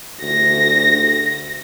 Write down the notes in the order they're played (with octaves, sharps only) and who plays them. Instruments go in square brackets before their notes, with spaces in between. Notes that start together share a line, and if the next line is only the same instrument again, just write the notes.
[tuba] D2 [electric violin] A#6